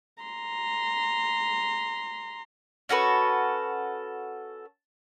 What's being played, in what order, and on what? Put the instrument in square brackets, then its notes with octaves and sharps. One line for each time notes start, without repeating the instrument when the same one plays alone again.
[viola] A#5 C6
[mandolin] C#4 F#4 A4 B4